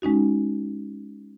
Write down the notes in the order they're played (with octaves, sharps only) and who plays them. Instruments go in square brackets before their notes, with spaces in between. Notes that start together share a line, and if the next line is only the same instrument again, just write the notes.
[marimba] G#3 C#4 D#4 F#4